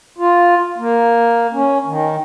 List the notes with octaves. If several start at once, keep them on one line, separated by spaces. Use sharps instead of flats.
F4
A#3
C#4
D#3